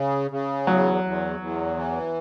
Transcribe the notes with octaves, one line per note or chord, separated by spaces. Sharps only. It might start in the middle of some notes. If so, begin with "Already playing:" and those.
Already playing: C#3
C#3
E2 F#3
E2
E2
E3